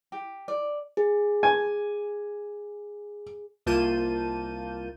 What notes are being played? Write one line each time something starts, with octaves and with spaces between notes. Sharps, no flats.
G4
D5
G#4
G#5
C2 A#3 F4 A5 G6 D#7